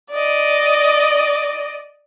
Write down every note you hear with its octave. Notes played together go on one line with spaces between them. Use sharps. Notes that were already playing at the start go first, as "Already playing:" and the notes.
D5 D#5